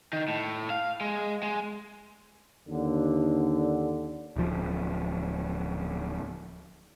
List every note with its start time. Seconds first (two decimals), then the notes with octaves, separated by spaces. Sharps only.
0.13 D#3
0.28 A2
0.70 F5
1.01 G#3
1.43 G#3
2.68 D#2 D3
4.36 D1 F3